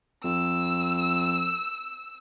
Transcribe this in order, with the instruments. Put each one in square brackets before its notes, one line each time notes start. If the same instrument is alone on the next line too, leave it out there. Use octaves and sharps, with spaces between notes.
[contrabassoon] F2 [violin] E6